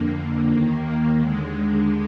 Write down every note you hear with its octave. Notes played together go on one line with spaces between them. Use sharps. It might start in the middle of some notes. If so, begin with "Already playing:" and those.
Already playing: F2 D3 A#3
A#3
D#2 D#3
D#2 D3 G#3